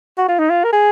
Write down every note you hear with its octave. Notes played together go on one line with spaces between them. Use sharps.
F#4
F4
D#4
F4
A#4
G#4